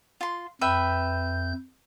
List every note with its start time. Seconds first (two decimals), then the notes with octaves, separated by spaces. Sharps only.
0.21 F4 C6
0.61 F2 B4 E5 G5 G6